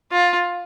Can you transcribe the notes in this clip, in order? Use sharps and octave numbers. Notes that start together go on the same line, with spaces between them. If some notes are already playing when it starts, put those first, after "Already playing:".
F4